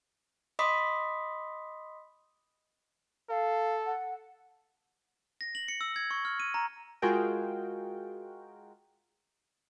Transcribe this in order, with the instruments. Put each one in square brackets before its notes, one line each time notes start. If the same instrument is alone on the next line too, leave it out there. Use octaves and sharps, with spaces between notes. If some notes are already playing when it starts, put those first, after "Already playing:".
[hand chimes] D#5 B5 C6 D6 D#6 B6
[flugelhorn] A4 [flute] F5
[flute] F#5
[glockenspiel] A#6
F#7
C#7
E6
G#6
C#6
F6
D#7
A#5
[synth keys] G#3 F4 F#4 G#4 A#4 G5